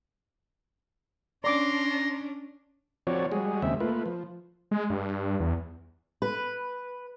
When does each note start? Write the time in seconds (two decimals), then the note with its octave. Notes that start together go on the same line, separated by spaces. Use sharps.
1.44 C#4 D4 D5 A#5 C6 D6
3.07 F3 C4 F#4 C#5 D5
3.32 G3 G#3 F#4 G#4
3.62 D#2 C#3 G#3 C4 E5
3.80 A3 A#3 F4 B4
4.06 F3
4.71 G#3
4.90 G2
5.40 E2
6.22 B4